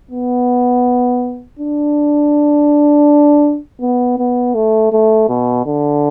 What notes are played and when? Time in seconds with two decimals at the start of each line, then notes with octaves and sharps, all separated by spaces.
0.11 B3
1.59 D4
3.81 B3
4.18 B3
4.55 A3
4.92 A3
5.29 B2
5.66 D3